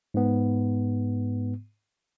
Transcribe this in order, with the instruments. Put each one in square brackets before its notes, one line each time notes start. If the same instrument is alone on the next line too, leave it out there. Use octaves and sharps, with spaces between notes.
[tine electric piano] G#2 B3